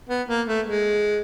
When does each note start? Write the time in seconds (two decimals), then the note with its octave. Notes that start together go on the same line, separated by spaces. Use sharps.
0.09 B3
0.29 A#3
0.47 A3
0.67 G#3